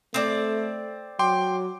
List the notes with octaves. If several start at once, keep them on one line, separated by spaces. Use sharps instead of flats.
A3 C4 D5
F#3 G5 C6 D6